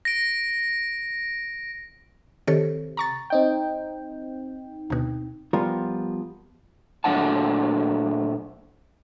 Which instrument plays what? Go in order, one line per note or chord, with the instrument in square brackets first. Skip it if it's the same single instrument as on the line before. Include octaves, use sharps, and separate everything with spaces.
[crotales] A#6 D7
[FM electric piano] C3 [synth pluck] D#3 A4 C#5
[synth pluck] A#5 C#6 A6
[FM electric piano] C4 D#4 G5
[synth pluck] D2 B2
[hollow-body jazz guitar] F3 G3 B3 F4 A#4
[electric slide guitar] A#2 F#3 A3 D4 F#5 A5